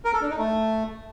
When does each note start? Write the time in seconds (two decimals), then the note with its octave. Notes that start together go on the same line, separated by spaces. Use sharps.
0.05 A#4
0.13 A4
0.22 D4
0.30 D#4
0.38 A3